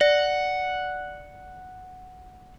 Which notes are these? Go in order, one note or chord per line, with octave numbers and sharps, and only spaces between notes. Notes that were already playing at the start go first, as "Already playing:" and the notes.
D5 F#5